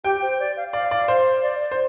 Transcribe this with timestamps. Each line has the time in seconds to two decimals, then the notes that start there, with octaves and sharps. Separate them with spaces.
0.04 G4 G5
0.22 C5
0.40 D5
0.57 F5
0.72 D5 F5
0.91 D5
1.08 C5
1.43 D5
1.61 D5
1.71 C5